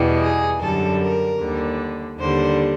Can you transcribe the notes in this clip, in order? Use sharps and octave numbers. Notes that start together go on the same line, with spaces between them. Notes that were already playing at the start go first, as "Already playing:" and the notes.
Already playing: E2 B2 G3
G#4
F#2 D3 G3 A4
A#4
D#2 D3 G3
D#2 D3 G3 C5